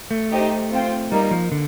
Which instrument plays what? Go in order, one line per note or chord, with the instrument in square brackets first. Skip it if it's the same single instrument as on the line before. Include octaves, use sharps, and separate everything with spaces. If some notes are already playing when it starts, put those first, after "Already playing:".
[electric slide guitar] A3
[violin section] D#4 G4 C5 D#5
C4 F4 C5 G5
[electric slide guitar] G3 [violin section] A#3 D#4 A#4
[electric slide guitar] F3
D3